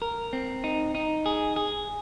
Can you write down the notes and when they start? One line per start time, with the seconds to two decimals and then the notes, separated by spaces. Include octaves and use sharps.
0.02 A#4
0.33 C4
0.64 D#4
0.95 D#4
1.26 G#4
1.56 G#4